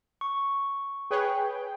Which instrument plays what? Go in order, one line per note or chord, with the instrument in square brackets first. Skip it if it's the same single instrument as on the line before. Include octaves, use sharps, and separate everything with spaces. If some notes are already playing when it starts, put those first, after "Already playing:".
[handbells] C#6
[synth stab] G#4 B4 C#5 [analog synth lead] G5